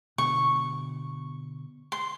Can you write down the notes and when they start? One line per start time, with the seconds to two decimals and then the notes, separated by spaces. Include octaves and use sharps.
0.18 B2 D3 C#6
1.92 C6